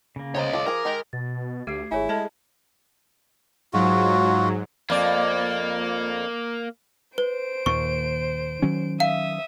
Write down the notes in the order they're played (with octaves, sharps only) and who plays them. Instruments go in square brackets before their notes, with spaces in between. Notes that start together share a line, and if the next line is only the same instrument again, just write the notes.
[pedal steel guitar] C#3 A#3
[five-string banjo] B3 C5 A#5 [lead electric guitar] C#5 D#5
[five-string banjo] F4 A4 [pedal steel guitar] D6
[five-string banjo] F3 G#4 [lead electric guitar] A#4
[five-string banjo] D#3 G#3 G4
[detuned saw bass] B2 [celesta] A6
[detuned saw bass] D2 [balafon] A3 G4 [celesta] G#6 C7
[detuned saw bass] G#1 [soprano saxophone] E4 [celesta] G#4 C#5 G#5
[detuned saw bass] G#3 [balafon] A4 D#5 A5 [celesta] G#6
[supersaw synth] G#2 F#3 [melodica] F4 F#4
[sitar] F2 D5 [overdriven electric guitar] A#3
[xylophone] B4 [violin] C5 D7
[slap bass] D#2 A#2 D#3 [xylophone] C#6
[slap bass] D#3 F#3 C#4
[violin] E5 D#6 [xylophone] F5